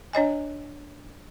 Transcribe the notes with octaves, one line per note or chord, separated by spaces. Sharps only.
D4 C#5 D#5 G#5